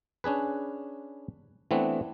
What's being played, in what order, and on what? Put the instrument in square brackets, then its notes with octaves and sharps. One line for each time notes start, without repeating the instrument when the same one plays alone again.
[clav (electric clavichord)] C#4 D4 G#4 B4
E3 A3 B3 C4 D4